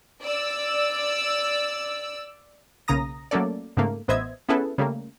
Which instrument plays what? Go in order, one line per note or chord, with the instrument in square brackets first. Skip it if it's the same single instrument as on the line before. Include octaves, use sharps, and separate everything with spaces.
[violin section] D5 E6
[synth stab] B1 C#3 A#3 A#5 D#6 A#6
F#3 A3 A#3 C#4 A4 D5
G#2 C#3 A3 A#3
A1 B3 C5 D#5 E5 G#6
B3 C#4 E4 G#4 A4 B4
C#3 G3 A3 A#3